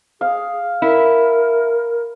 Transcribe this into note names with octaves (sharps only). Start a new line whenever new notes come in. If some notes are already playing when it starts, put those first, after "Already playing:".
G#4 F5
E4 A#4